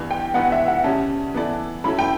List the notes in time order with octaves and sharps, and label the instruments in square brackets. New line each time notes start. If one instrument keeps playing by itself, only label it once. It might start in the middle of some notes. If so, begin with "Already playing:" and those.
Already playing: [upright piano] G2 E3 B3
[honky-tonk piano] G5
[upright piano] G2 E3 B3 [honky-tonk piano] F#5
[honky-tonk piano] E5
F#5
[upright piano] C#3 G3 C#4 [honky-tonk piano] A5
[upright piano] E3 B3 E4 A4 D5
[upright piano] F#3 C#4 E4 A4 [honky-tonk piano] B5
[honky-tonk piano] G5